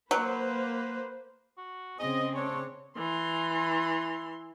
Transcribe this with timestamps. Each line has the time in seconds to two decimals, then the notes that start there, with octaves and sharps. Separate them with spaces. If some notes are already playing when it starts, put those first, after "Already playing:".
0.11 F#3 A#3 B4 C5
1.57 F#4
1.99 C#3 C4 G#4 D#5
2.35 A3 D4 C5 C#5
2.96 E3 C6